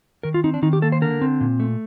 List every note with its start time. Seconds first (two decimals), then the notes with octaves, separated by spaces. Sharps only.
0.23 D#3 A#4
0.34 F4
0.44 C4 D#4
0.54 D4
0.62 D#3 D#4
0.73 G4
0.82 A#3 A4
0.92 C5
1.02 D3 A#4
1.21 C4
1.41 A#2
1.60 A3